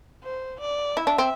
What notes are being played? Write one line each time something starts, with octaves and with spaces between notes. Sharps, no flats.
C5
D5
E4 E5
D4
C4